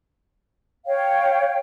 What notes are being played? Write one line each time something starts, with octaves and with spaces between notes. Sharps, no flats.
C#5 F5 G5